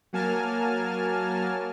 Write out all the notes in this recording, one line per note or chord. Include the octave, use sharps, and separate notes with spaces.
F#3 A#3 G#5 A5 F6